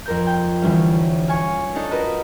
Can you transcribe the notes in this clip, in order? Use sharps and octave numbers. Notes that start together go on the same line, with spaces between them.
F2 A#4 G6
G5
D2 E3 G3 C#4
F5 G#5 C#6
D4 D#4 A4
F4 F#4 A#4 B4 D#5